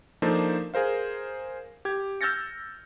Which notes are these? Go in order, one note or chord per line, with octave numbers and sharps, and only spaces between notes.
F3 A#3 D4 D#4 A4 C5
G#4 A#4 C5 F5
G4 G#6
E6 F6 G6 A6 A#6 C#7